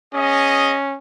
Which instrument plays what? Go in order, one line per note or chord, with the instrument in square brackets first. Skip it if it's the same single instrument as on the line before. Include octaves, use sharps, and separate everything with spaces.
[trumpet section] B3 G#4 D#5 [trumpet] C#4